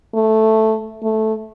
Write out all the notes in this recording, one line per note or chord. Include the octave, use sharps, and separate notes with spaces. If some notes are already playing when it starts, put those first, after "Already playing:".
A3
A3